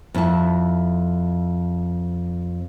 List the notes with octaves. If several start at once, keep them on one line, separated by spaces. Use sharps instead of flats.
F2 E4 A5